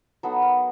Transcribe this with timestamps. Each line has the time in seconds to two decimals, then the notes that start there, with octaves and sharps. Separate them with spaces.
0.23 F#3 B3 D#4 A4
0.42 A#4